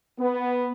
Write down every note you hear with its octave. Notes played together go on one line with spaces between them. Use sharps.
B3